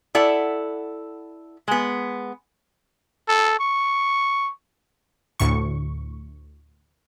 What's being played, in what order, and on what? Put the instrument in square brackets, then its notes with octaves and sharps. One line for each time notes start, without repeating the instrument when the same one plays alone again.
[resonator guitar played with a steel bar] E4 A4 D5 F#5
G#3 B3
[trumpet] A4
C#6
[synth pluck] D2 A2 C#6